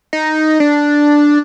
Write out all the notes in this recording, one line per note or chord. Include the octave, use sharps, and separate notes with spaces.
D#4
D4